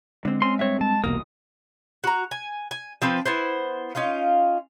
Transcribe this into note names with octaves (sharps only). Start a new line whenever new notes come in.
D3 G#3 C4
C4 C#4 C6
G2 C4 C#5 E5
G#3 A5
E1 C2 B2 A#3 D#6
F#4 A#5
G#5
G#5
F3 C4 B4
B3 E4 C5
C#4 D#4 F4 F5